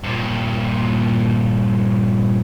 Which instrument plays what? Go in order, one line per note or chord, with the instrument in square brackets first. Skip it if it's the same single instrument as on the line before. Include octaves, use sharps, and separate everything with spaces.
[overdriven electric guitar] G2 A#2